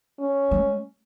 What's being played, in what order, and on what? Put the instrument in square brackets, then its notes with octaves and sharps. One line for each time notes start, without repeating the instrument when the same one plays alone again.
[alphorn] C#4
[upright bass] G#3